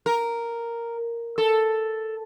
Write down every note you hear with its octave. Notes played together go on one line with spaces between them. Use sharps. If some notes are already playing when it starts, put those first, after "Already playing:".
A#4
A4